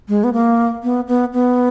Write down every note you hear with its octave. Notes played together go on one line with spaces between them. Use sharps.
G#3
B3
A#3
B3
B3
B3